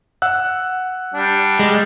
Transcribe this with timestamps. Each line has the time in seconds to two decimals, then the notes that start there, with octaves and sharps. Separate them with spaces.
0.22 F#5 E6 F#6
1.14 G3 D4
1.59 G#3